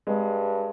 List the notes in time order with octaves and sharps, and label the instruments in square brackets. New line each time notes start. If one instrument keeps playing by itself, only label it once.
[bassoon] G2 [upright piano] G#3